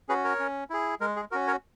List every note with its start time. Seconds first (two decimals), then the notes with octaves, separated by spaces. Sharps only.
0.09 C#4 F#4 G#4 B4
0.24 A#4 C#5
0.39 C#4
0.70 E4 G#4
1.00 G#3 A#4
1.16 G#4
1.31 C#4 F#4 A#4
1.47 A#4 C#5